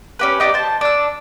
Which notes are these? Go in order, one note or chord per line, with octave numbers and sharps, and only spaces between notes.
C#4 G4 B4
D#4 G4 D5
C5 A5
D4 E6